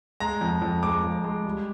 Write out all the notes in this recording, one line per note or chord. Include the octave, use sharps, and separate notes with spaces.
G#3 A#5
F2
F2
G#3 D6
F2
G#3
G3